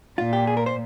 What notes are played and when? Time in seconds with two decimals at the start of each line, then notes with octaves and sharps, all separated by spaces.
0.18 A#2 F4
0.33 G4
0.47 G#4
0.57 A#4
0.66 C5